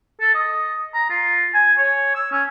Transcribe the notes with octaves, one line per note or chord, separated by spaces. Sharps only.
A4
D#5
A#5
F4
G#5
C#5
E6
C#4